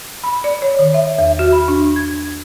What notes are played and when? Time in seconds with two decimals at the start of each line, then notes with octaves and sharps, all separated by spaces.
0.24 B5
0.44 D5
0.62 C#5
0.79 D#3
0.94 E5
1.18 E2
1.39 F#4
1.52 B5
1.68 D4
1.96 G#6